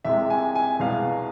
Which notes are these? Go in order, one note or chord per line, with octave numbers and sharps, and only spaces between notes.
C2 C3 G#3 E5
G#5
G#5
C2 B2 G#3 F5